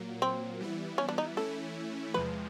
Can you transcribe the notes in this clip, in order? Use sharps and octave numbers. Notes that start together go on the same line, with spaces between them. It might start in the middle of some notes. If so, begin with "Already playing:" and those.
Already playing: A#2 F#3 A#3
C4
E3 G3 B3 E4
C#4
D4
D#4
E3 A3 C#4 E4 A4
E2 C3 F3 G#3 B4